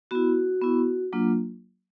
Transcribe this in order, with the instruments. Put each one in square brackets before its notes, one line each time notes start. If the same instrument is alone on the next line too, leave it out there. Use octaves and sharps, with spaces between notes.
[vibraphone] B3 E4 F#4
B3 E4
F#3 A#3 D4 F4